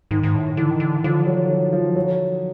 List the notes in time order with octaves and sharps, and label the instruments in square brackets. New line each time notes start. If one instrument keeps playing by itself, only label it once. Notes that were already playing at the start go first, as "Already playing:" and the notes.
[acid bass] G#2 [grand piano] D#3
[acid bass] G#2
A2
[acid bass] D3 [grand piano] E3
[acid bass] D#3
D3
[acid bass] D3 [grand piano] F3
[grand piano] F#3
F#3
F3
F#3